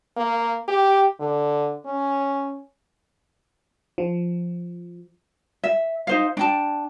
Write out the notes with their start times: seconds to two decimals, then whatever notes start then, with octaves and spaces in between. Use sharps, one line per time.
0.17 A#3
0.68 G4
1.20 D3
1.86 C#4
3.98 F3
5.64 E5
6.07 D#4 C5 F5
6.37 D4 G5 A5